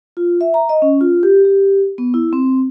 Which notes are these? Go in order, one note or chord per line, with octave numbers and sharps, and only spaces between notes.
F4
E5
A#5
D#5
C#4
F4
G4
G4
B3
E4
C4